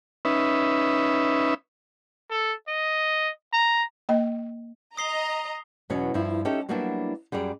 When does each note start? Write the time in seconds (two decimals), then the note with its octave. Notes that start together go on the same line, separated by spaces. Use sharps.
0.25 C#4 D#4 B4 E5
2.30 A4
2.68 D#5
3.53 A#5
4.09 A#3 D#5 G5
4.97 D#5 A#5 D#6 C7 G7
5.90 E2 B2 F#3 C#4
6.14 G2 F3 E4
6.45 C#4 D#4 G4 A4 E5
6.69 F#3 G3 A#3 B3 D4 E4
7.32 F#2 G3 G#4 D5